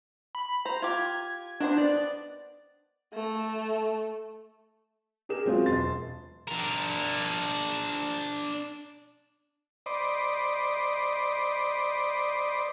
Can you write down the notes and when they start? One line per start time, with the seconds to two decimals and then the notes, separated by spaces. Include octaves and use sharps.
0.35 B5
0.65 C5 A#5
0.82 F4 G4 G#6
1.60 D#3 B3 D4 C5
1.78 D5
3.13 A3
5.29 G4 G#4 A#4 E7
5.45 F#3 G#3 C4 C#4 F4
5.66 E1 C6 A6
6.48 D4 A#4
9.86 C5 D5 D#5 B5